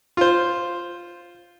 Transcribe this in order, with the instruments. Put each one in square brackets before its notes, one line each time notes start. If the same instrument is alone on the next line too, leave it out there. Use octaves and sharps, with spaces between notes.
[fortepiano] F4 C5